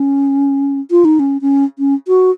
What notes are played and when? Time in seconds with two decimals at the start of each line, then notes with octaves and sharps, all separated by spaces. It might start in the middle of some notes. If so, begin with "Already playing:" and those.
Already playing: C#4
0.91 F4
1.05 D#4
1.19 C#4
1.41 C#4
1.79 C#4
2.08 F#4